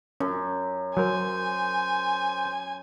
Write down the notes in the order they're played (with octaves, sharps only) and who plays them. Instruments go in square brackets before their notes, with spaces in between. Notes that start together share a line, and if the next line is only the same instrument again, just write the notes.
[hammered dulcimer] F#2 [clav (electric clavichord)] C#4
[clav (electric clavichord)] F#3 A#4 [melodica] C5 [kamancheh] G#5